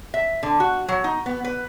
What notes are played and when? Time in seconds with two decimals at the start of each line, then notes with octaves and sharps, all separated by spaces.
0.14 E5
0.43 D3
0.60 F#4
0.88 F#3
1.04 D#4
1.26 B3
1.45 B4